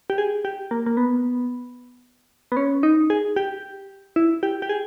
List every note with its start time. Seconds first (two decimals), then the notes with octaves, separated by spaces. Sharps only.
0.10 G4
0.18 G#4
0.45 G4
0.71 A#3
0.86 A#3
0.97 B3
2.52 B3
2.57 C#4
2.83 D#4
3.10 G#4
3.36 G4
4.16 E4
4.43 G4
4.62 G4
4.69 G#4